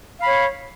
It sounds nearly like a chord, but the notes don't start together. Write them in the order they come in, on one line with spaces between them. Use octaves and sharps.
F5 B5 C#5